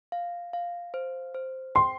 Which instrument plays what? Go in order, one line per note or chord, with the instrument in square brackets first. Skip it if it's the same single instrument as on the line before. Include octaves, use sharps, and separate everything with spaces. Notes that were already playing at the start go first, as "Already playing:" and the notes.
[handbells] F5
F5
C5
C5
[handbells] G5 [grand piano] C6